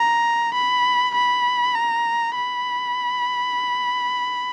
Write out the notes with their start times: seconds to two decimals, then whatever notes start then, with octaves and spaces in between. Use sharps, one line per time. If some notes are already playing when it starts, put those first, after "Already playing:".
Already playing: A#5
0.54 B5
1.14 B5
1.75 A#5
2.35 B5